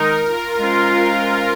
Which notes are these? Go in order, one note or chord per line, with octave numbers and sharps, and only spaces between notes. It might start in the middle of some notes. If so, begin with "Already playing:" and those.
Already playing: D#3 G#3 D#4 A#4
F4
G#3 C#4 F4 C5